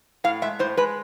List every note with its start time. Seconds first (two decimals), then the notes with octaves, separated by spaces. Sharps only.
0.24 A2 F5
0.42 G#3 E5
0.59 A2 C5
0.77 G#3 B4